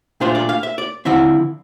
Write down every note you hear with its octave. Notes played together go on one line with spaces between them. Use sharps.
A#2 A3 D4 F4 C5
D5
F5
E5
D5
D3 F3 C4 E4 E5